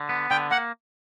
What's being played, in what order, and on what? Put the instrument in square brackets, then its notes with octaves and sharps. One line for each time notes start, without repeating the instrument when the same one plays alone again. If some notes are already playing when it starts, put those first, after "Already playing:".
Already playing: [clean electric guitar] D3
B3
[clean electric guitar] D3 [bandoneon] G5
[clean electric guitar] A#3 [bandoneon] F#5